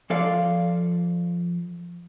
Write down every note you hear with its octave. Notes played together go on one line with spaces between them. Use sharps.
F3 F4 A4 D5 F5